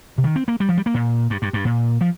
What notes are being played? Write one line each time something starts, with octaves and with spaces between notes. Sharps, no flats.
C3
D#3
C4
A#3
G3
F3
G3
A#3
A#2
G2
G2
G2
A#2
F3